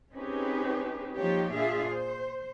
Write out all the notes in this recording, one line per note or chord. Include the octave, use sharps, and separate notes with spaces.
C4 C#4 D#4 G4 G#4 B4
F3 A#3 D#4 F4 G4 C#5
A#2 D4 F4 G#4 E5 F5
C5